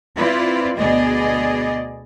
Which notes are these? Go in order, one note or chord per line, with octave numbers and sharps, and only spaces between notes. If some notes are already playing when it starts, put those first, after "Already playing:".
C4 E4 F4 B4 D5
D2 B2 B3 G#4 D5 D#5